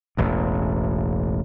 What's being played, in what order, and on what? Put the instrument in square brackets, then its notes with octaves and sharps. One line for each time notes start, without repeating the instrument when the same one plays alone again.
[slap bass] E1 A1 E2